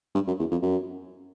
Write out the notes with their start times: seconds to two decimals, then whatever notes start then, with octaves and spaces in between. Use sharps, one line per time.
0.15 G2
0.27 F#2
0.39 E2
0.51 F2
0.62 F#2